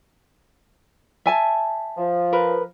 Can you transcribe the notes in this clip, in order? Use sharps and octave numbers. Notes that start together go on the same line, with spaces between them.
E5 G#5 A5
F3
A#4 B4